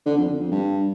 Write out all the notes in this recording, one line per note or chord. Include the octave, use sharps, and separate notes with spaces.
D3
F2
D3
F2
G2